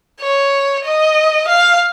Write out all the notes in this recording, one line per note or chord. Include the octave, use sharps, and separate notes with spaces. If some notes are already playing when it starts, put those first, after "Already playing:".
C#5
D#5
F5